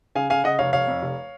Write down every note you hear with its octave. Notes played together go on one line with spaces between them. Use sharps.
C#3 F5 G#5
C#3 F5 G#5
C#3 D#5 F#5
F1 C#5 F5
F1 C#5 F5
F2
F1